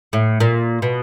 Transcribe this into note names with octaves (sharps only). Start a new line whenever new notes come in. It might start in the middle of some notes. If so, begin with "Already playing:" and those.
A2
A#2
B2